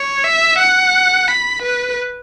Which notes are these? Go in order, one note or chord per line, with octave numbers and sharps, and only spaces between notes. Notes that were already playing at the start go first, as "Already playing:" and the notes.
Already playing: C#5
E5
F#5
B5
B4